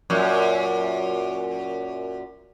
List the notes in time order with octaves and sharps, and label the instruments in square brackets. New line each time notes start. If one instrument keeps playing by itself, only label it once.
[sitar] F#2 A#2